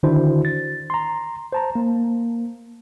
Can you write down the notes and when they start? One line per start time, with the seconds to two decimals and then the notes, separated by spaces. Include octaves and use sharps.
0.03 D3 D#3 D4 E4 F#4 C5
0.45 A6
0.90 A#5 C6
1.53 C5 A5 A#5
1.75 A#3